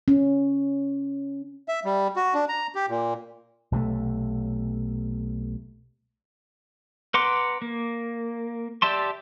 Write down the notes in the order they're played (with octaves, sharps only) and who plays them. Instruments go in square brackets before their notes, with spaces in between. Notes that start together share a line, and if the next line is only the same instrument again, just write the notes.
[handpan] C#4
[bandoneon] E5
G3
F#4
D4
A#5
G4
A#2
[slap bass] B1 C3 G3 A3
[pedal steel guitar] B4 F#5 A#5 C6 D6
A#3
G4 D5 E5 A5 C6